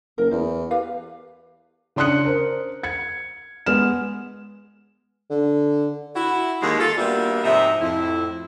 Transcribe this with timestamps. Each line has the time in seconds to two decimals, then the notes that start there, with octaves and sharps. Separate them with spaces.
0.18 F#1 A#4
0.31 E2 C5
0.71 G4 B4 F5
1.96 C#3 D4 C6 D#6 F#6 C#7
2.25 A#4 C5
2.83 G#6 C#7
3.66 G#3 B3 F6 E7
5.30 D3
6.16 E4 F#4
6.62 D#2 G#3
6.80 F4 A4
6.97 G3 A#3 B3 D4 F#4 E5
7.44 G#2 C3 F3 D#4 E5
7.81 F2 A2 E4